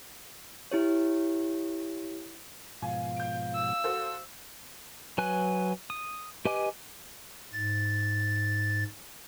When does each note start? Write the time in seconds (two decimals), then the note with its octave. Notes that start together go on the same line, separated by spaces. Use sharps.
0.71 E4 G4 C#5
2.82 G#2 B2 F3 F5 G#5
3.16 G6 D7
3.55 E6
3.84 F#4 A4 C5
5.18 F#3 B4 G#5 F#6
5.90 D#6
6.45 G4 B4 D#5 G#5 D6
7.53 G#2 A6